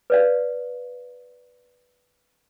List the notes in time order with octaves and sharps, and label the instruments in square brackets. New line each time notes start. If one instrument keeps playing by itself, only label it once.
[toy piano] B4 D5 F5